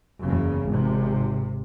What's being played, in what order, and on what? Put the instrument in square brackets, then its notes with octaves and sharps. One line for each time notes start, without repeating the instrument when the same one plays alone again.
[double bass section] F#1 E2 C#3
G#1 C3